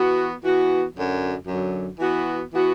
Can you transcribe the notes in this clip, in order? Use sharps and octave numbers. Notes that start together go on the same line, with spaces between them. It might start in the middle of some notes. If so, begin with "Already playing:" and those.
Already playing: E3 B3 F#4
E3 B3 F#4
F#2 D3 F#3
F#2 D3 F#3
E3 B3 F#4
E3 B3 F#4